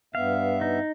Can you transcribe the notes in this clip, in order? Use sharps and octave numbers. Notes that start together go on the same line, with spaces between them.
G2 B3 E5 F5
D#4